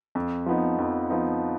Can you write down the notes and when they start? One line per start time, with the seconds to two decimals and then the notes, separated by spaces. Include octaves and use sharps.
0.15 F2
0.46 F3 B3 D#4
0.78 F2
1.10 F3 B3 D#4